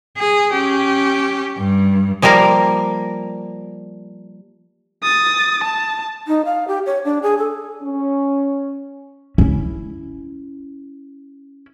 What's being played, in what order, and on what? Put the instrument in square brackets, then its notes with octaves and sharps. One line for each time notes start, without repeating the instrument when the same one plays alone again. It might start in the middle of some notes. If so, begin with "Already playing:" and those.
[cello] G#4
C#4 G4
G2
[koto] F3 G3 A#3 A#4 F5
[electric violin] D#6 A6
A5
[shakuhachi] D#4
F5
G4
C#5
D4
G#4
A4
[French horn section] C#4
[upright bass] C#4 E4